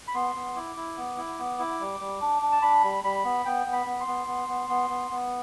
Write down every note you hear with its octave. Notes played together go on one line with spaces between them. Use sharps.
B5
B3 C6
B3
E4 D6
E4
B3
E4
B3
E4
G3
G3
D4
D4
A5
D4 B5
G3
G3 B5
B3
B3 G5
B3
B5
B3
C6
B3
B3
B3
B3
B3
B3